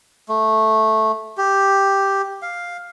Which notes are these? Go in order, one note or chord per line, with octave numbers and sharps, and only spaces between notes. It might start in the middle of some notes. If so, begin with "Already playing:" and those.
A3
G4
F5